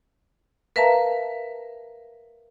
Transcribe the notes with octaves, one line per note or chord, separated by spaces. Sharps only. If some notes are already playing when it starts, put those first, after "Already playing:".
A#4 B4 E5 F5 A5 A#5